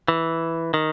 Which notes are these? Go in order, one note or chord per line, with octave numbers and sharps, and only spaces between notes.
E3
D#3